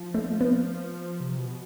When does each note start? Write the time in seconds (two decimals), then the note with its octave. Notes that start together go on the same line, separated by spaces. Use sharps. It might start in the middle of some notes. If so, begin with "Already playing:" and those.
Already playing: F3
0.14 A3
0.41 B3
1.20 C3
1.38 B2